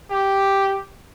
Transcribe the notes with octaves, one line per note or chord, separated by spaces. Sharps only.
G4